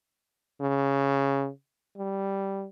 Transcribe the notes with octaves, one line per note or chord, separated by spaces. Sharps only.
C#3
G3